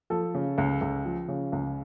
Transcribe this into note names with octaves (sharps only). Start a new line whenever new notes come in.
F3 A4
C#3
C#2
C#2
F3
C#3
C#2